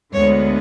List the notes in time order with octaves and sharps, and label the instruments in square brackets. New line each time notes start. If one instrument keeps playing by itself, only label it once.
[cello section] D2 D3 G#3 B3 C#5